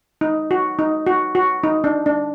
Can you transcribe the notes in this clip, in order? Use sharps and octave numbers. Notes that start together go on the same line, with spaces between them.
D#4
F#4
D#4
F#4
F#4
D#4
D4
D4